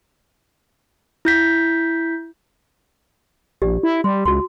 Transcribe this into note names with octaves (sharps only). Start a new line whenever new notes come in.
E4 G6 B6
A#1 G4 D5
E4
G3 C6
C#2 F#4 C6